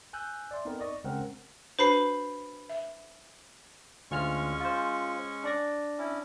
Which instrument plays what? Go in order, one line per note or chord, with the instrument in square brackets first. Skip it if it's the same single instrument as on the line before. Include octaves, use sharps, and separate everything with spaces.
[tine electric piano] G#5 E6 F#6 G6
D5 E5 C6
B3 C4 D#4 A4 A#4
D5 D#5 C#6
C#3 G#3 C4 C#4 A#4 F#5
[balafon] D4 F#4 B4 [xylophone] C5 B5 C7
[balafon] E5
[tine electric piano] D2 F4 F6 [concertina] G#3 C#4 C#6
[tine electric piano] F4 C5
D4 D5 A#6
[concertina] C#4 E4